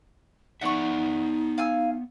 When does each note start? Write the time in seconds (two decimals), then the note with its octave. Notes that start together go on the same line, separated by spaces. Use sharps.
0.61 B3 D#4 D5 E5 F#5 C#6
1.58 F5 G#5 E6